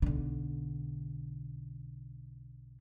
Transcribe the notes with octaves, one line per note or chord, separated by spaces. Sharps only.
B1 D3